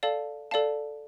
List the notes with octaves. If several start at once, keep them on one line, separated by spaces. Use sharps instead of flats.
A4 D5 F5 A5
A4 D5 F5 A5